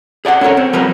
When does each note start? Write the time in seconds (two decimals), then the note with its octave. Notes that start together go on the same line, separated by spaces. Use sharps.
0.25 G#4 D5 F5 F#5
0.41 C#4 A4 A#4 C#5
0.57 C4
0.73 F3 G3 A#4 B4